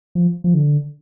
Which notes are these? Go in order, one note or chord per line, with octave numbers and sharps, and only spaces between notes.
F3
F3
D3